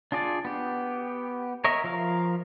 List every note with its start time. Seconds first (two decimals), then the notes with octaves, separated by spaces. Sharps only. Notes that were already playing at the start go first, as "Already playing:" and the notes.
0.12 D4 F4 G#4 D5
0.45 B3 G4
1.64 A#4 C#5 D#5 E5
1.84 F3 A#4 F5